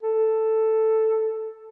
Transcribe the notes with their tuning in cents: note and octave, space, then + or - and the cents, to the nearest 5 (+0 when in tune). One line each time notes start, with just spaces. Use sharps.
A4 +5